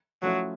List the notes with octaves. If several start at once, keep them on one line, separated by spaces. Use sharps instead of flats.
F3 F#3 A3 C#4 E4